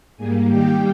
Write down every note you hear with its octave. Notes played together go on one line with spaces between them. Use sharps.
G#2 G3 A#3 G#4 G#5
G2 D#3 G3 A#3 G4 G5